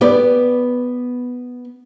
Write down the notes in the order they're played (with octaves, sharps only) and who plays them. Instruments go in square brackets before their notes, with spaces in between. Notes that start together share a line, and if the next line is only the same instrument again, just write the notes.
[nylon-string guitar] B3 G4 B4 D5